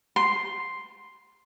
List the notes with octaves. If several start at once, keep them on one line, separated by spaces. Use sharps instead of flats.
C6